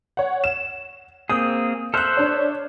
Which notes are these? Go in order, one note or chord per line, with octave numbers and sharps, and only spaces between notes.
C#5 F#5
E7
A#3 C4 G#4 D#6
A4 C5 E5 F6 F#6
D4 C#5